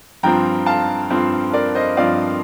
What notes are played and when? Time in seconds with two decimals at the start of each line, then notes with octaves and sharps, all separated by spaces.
0.23 G2 F3 C4 G5 A#5
0.66 F5 A5
1.10 G2 F3 C4
1.53 A#4 D5
1.75 C5 D#5
1.97 G2 F3 C4 D5 F5